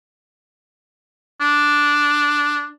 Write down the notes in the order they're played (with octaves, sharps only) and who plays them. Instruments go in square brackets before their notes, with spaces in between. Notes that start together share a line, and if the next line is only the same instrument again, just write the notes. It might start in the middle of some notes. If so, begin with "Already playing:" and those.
[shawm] D4